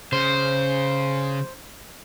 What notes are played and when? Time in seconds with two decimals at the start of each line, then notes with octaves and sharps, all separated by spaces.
0.13 C#3 C5